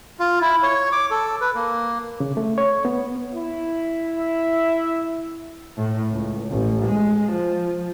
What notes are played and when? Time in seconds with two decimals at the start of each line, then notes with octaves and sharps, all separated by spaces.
0.20 F4
0.41 E4
0.63 C#5
0.92 D6
1.11 A4
1.41 B4
1.55 A#3
2.20 C#3
2.37 A3
2.58 C#5
2.85 B3
3.33 E4
4.18 E5
5.77 A2
6.11 C#2
6.51 A1
6.86 G#3
7.32 F3